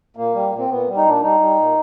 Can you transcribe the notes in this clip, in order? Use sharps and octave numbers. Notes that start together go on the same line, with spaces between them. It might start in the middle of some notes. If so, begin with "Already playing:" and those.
A#2 A#3
G3
A#2
C4
A#2 B3
G3
D#4
A#2 D4
G3 D#4
G3
A#2